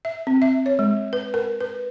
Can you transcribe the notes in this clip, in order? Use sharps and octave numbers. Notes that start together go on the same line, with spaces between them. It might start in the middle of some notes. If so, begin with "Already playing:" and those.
E5
C4
E5
C#5
G#3
B4
A#4
B4